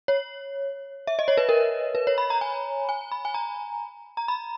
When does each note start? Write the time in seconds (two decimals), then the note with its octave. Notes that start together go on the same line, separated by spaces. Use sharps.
0.08 C#5
1.07 E5
1.19 D#5
1.28 C#5
1.37 B4
1.49 A#4
1.95 B4
2.07 C#5
2.18 B5
2.30 A#5
2.41 G#5
2.89 G#5
3.11 B5
3.25 G#5
3.34 A#5
4.17 A#5
4.28 B5